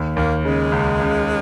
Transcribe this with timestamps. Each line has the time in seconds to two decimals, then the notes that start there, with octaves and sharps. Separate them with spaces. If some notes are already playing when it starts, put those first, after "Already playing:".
Already playing: D#2
0.16 D#2 A#3
0.44 C#3 G#3
0.72 C#2
1.00 C#2